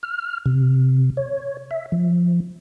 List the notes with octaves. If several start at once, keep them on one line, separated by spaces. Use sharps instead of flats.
F6
C3
C#5
E5
F3